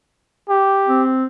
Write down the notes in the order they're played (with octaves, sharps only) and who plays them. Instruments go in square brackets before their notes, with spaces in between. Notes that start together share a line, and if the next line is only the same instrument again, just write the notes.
[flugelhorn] G4
[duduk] C4